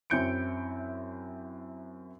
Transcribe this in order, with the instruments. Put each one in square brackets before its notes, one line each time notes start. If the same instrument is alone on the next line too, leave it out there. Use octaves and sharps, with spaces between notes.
[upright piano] F#2 C4 E4 G6 C#7 D7